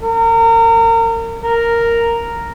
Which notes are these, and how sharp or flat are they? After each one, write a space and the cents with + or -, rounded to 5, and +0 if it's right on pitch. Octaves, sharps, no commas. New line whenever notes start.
A#4 -30
A#4 -5